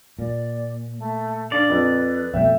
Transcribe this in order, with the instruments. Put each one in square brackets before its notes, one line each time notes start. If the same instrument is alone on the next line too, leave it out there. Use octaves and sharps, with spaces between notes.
[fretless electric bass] A#2 [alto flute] D5
[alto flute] A3
[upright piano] D4 [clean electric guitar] D5 [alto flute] F5
[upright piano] F2 [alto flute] B4
[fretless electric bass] F2 B2 A3 [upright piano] E5 [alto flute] G5